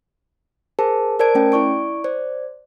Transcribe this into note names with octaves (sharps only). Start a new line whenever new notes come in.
G#4 A#4 C5 A5
A#4 C5 D5 A5 G#6 D7
A3 C#4 G5
E4 D5 C#6 D7
C5 D5